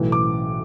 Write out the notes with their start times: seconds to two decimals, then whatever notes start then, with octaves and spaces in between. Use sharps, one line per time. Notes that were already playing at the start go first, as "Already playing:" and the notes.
Already playing: B1 A2 E3
0.12 D6